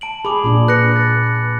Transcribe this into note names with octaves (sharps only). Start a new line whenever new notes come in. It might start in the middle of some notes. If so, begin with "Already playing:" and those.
A5 D7 F#7
G#4 B5 D6
A#2 D4
B4 F#6 A#6 C#7
A6